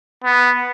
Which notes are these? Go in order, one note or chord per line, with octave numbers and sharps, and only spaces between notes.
B3